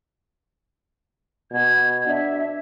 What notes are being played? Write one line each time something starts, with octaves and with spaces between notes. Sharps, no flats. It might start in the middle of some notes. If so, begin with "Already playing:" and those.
B2 G#6
D4 E5